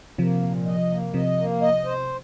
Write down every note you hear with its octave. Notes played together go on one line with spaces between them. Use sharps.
C3 F3 A#3
A#2
D#5
A#3
C3 F3 D#5
A#3
D#5
C5